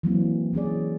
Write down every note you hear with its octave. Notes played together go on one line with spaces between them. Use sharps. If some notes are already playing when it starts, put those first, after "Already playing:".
E3 F#3 A#3 C4
E3 C#4 G#4 D5